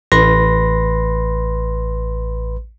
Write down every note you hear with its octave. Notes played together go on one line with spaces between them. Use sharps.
A1 B4 B5 C6 A#6